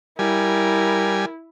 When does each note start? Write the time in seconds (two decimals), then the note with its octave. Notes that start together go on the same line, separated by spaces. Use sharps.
0.19 G3 E4 A#4 G#5